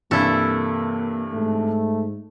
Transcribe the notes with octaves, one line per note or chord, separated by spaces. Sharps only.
G2 C3 E3 A#3 E4 A4
G#2 A3